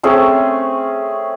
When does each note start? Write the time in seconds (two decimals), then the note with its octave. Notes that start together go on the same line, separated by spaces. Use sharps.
0.03 A3 C4 C#4 G#4